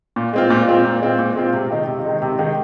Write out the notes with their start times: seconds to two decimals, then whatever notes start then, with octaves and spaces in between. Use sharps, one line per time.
0.16 A#2
0.33 G#3 C4 F4
0.50 A#2
0.68 G#3 C4 F4
0.85 A#2
1.02 G#3 C4 F4
1.19 A#2
1.35 G#3 C4 F4
1.53 C3
1.70 D#3 G#3 D#4
1.87 C3
2.05 D#3 G#3 D#4
2.22 C3
2.39 D#3 G#3 D#4